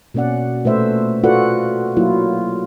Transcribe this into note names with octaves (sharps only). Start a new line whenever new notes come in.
B2 A#3 C#4 D5 F#5
A#2 A3 B4 C5 E5
F4 F#4 A4 B4 D5 F#5
F#3 A#3 E4 F4